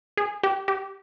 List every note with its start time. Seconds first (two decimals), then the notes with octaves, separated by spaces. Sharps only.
0.17 G#4
0.43 G4
0.68 G4